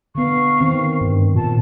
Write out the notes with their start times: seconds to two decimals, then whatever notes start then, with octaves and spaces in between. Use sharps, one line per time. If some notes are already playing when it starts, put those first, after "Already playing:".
0.15 D3 B3 F5 C#6
0.60 D#3 C4
1.01 G2
1.35 A#2 A5